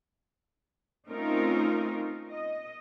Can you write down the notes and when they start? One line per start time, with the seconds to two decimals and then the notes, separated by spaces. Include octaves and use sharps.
1.08 A3 C4 C#4 D#4 F4 A#4
2.31 D#5